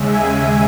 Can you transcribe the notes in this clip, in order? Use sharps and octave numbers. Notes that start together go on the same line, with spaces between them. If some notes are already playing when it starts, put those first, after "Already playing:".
Already playing: D#2 C#3 G#3 E5
G#5